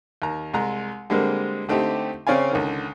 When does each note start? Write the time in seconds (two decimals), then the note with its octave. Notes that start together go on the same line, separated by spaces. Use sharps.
0.22 D#2 A#5
0.54 C2 G#3 A#5
1.10 D3 G3 G#3 A#3 C4
1.69 D3 A3 C4 D#4 G4
2.27 C#3 C4 C#4 D5 F5 G#5
2.51 C#2 D3 D#3